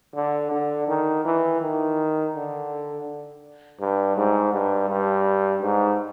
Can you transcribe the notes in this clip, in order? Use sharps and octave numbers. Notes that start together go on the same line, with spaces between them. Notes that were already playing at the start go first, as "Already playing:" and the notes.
D3
D3
D#3
E3
D#3
D3
G2
G#2
G2
G2
G#2